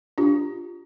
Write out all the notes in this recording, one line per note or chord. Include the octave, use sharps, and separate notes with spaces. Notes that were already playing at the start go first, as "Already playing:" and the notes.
D4 F4 G4